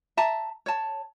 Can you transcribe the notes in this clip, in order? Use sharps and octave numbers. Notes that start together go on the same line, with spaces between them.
E5 A5 A#5
C#5 A5